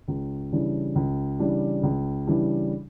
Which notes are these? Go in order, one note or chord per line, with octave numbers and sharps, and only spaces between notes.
C#2
C#3 E3 G3 D4
C#2
C#3 E3 G3 D4
C#2
C#3 E3 G3 D4